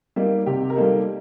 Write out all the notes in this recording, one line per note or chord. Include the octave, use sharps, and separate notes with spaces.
G3 A#3 D#4
C3 G4
A#4
G3 A#3 D#4 A4